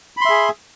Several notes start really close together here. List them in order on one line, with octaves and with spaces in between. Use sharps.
B5 C6 E5 G#4